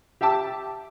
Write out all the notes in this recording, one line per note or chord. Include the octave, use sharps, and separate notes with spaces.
G4 E5 G5 A5 D6 E6